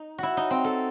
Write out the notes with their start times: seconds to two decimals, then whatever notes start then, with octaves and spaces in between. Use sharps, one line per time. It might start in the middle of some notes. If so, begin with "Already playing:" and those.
Already playing: D#4
0.18 E4 F#4
0.37 D#4
0.51 C4
0.64 A4